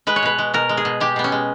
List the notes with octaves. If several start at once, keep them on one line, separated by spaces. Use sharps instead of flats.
G#3 B4
C#5
B2 B4
G#3
B2 A#4
G#3
G#4
B2
G#3 G4
B2 B3
C#4
G#3